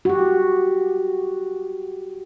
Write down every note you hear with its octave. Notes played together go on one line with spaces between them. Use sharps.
F#4 G4